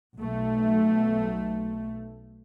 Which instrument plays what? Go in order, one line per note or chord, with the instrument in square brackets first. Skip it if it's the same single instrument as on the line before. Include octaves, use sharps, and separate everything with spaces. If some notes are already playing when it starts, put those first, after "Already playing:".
[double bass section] B1 A3